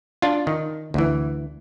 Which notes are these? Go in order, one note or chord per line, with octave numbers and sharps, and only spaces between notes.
D4 F4
D#3
D2 E3